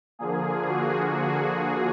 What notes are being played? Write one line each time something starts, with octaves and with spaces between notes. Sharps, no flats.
D3 F3 A#3 G#4
F#4
G#4